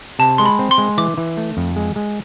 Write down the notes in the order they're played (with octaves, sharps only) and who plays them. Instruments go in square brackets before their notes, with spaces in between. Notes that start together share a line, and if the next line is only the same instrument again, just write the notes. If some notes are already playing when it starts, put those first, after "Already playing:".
[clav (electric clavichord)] C3 [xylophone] A5
[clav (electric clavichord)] G#3 [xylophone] C6
[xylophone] B5
[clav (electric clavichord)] C4
[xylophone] C6
[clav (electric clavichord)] G#3
[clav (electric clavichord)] E3 [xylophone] D6
[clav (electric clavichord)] E3
A3
F2
G#3
G#3